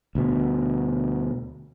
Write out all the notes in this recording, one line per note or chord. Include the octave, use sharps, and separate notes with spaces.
D2 B2